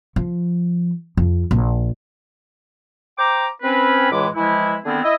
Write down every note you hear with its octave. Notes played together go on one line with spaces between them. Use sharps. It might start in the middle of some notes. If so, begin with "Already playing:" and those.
F3
F2
A#1
C5 G5 A#5 D6
C4 C#4 B4
C#2 A2 E3 G#3 B5 D6
E3 F3 G#3 E4
D3 D#3 B3 C4 E4 G#4
E4 D#5 E5